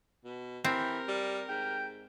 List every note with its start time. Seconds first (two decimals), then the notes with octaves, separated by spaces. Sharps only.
0.25 B2
0.64 E3 C4 G4 A#4
1.08 G3
1.49 G#2 G5